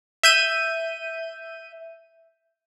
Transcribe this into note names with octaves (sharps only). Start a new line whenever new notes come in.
E5 G6 D#7